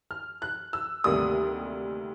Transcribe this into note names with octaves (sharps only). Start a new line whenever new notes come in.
F6
F#6
E6
D2 C3 D#3 G3 A#3 D#6